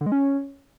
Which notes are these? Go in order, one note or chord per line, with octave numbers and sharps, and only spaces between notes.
D3
G#3
C#4